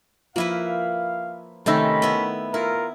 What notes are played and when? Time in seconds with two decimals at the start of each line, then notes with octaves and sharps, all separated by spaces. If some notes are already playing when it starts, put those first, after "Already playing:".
0.36 F3 A#3 E4 B4 F5
1.66 C3 D#3 A3 C#4 D#4 E5 B5 E6
2.02 B3 E4
2.54 E4 F4 A#4